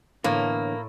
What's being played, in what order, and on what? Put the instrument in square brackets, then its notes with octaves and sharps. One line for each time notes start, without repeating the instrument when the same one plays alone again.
[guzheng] A2 [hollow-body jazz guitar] D3 E3 B3 [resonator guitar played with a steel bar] A#3